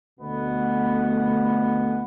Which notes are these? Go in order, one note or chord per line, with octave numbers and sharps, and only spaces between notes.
D2 B2 A3 B3